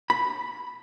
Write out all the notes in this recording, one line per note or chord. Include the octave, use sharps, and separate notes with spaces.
B5